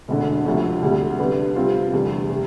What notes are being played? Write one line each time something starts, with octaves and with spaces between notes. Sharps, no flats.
E1 D2 D3
D2 C3 F3 A3
D2 C3 G3
D3 G3 B3
C3 G3 C4 F4
F1 E2 D3 G3
C3